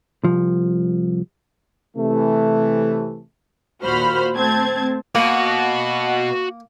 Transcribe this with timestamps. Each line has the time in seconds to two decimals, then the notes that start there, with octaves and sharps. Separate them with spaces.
0.24 C2 F3
1.96 C3 E3 A3
3.84 D#2 A#2 F#4 C5 B5 F6
4.35 A3 C4 A5 G#6
5.15 B2 A#3 F#4 F#5